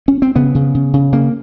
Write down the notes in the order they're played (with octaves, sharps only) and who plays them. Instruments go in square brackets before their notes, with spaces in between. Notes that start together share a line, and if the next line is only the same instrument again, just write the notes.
[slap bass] C#4
C4
C#3 B3
C#3
C#3
C#3
C#3 A#3